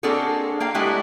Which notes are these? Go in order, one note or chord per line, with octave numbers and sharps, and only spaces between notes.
A#3 C4 D4 F#4 G#4 A4
A#3 F5 G5
G#3 A3 B3 E4 G4 D5